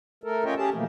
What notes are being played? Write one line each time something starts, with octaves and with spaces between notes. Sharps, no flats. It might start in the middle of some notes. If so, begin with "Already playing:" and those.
A3 A4 A#4
C#4 F4 C#5 D#5 E5 G5
C#4 G4 G#4 A5
B2 E3 F3 A3 A#3